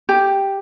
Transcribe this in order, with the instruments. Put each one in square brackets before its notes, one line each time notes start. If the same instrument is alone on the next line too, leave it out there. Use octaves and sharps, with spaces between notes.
[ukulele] G4